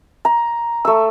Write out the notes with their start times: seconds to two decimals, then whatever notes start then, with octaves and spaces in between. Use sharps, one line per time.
0.25 A#5
0.85 A3 E6